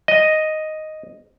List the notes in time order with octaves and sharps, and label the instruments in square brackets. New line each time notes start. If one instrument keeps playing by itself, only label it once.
[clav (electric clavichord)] D#5